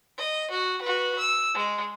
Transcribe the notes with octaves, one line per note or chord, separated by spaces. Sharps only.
D#5
F#4
F#4 B4
E6
G#3